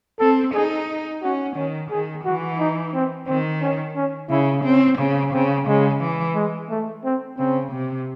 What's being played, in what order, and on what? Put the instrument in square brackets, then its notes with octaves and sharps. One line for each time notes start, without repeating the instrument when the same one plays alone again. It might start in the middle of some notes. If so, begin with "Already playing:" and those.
[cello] C4 [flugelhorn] A4
[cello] D#4 [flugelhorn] G#4
[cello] C#4 [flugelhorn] F#4
[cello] D#3 [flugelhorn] C#4
[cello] D#3 [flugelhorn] G#4
[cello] E3 [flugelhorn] F#4
[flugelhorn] D#4
C4
[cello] D#3 [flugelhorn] C4
[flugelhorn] C#4
C#4
[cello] C#3 [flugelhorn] E4
[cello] C4 [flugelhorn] C#4
[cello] C#3
[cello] C#3 [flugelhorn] C4
[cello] C#3 [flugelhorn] G#3
[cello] E3
[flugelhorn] G#3
A3
C4
[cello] C#3 [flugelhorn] C4
[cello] C3